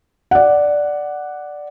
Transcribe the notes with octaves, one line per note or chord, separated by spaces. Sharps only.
D5 F#5